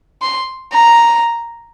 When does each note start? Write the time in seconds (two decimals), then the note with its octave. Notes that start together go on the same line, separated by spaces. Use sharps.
0.22 C6
0.73 A#5